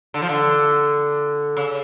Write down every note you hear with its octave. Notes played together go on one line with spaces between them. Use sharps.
D3
F3
D3
C#3